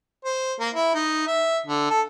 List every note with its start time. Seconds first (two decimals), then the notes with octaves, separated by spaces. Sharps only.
0.24 C5
0.60 A#3
0.74 E4
0.94 D#4
1.27 E5
1.66 D3
1.90 A4